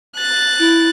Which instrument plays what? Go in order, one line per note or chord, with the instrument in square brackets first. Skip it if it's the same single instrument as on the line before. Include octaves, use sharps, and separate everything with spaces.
[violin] F#6 A6
[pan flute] E4